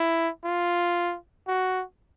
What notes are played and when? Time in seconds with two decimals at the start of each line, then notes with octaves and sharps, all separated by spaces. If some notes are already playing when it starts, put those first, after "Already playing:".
Already playing: E4
0.44 F4
1.48 F#4